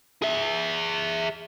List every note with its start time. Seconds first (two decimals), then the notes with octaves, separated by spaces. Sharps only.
0.22 G#4 E5